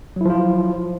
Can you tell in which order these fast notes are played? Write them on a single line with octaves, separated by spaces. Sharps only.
F#3 E4 F3 F4